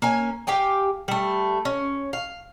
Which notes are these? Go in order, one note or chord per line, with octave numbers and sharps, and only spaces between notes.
A#3 C#4 G#5
G4 F5 G5 G#5
G3 A3
C#4
F5